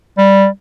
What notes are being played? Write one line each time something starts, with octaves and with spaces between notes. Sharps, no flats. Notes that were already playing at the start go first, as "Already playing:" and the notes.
G3